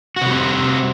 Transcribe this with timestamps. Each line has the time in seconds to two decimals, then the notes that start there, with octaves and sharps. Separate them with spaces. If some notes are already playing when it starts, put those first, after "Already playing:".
0.16 F#4
0.21 C3
0.26 G3
0.31 C4